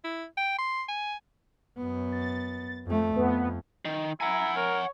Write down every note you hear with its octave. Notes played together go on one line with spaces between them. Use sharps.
E4
G5
C6
G#5
F#2 B3
A6
F2 A3
F2 B3
D#3
E4 F#5 G#5 A#5
A#4 C#5